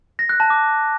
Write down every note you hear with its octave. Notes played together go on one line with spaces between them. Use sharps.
A#6
F#6
A5
D6